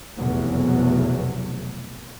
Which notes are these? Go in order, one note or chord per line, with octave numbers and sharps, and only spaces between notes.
F1 B1 E2 C3 F#3